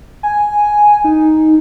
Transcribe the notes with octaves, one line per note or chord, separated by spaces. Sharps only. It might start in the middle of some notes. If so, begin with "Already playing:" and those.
G#5
D#4